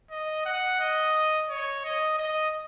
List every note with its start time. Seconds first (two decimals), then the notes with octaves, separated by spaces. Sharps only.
0.11 D#5
0.45 F#5
0.80 D#5
1.49 C#5
1.85 D#5
2.19 D#5